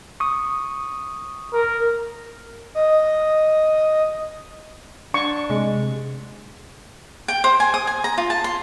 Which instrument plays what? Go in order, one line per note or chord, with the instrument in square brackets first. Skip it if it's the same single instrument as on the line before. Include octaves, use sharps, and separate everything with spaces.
[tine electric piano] C#6 D#6
[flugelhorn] A#4
[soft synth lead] D#5
[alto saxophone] D4 [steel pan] C#6
[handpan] C3 [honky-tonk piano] G#3
[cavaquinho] G5
C5
G#5
D#6
G#5
A#5
F4
A5
C6